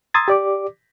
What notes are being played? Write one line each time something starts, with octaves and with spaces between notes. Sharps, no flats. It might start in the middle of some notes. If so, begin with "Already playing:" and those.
A#5 C6 D#6 E6 G#6 A6
G4 D5 D6